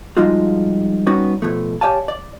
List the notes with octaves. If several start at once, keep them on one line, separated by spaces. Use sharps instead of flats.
F3 G3 G#3 D#4 F4 F#4
G3 B3 C#4 D#4 F#4
B2 F3 A3
G4 C#5 D5 F5 G#5 A5
D5